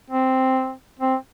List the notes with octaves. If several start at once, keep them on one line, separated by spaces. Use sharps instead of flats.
C4
C4